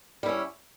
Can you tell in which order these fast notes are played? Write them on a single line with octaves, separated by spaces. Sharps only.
G3 E4 C#4